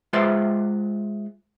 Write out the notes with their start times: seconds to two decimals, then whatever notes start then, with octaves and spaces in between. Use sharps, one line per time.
0.13 G#3 F4 B4 C5 E5 C6